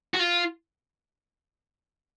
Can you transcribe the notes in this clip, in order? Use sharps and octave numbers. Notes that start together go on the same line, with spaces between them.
F#4
F4